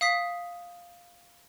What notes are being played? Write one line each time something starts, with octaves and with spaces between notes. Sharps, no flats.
F5 D#6 B6